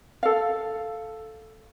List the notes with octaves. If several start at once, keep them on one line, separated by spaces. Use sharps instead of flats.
A4 F5